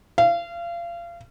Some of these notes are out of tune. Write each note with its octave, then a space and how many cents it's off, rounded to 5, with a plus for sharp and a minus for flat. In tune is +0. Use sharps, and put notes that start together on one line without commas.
F5 -30